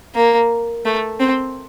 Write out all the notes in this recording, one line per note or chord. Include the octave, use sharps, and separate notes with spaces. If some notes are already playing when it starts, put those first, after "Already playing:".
A#3
A3
C4